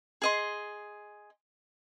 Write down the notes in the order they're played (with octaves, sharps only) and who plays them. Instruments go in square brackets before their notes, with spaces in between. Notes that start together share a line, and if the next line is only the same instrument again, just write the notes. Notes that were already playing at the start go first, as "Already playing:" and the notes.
[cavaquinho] G#4 D#5 C6